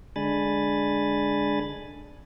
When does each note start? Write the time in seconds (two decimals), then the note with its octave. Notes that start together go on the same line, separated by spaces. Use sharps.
0.16 D3 G#3 D4 G#5 B5 A6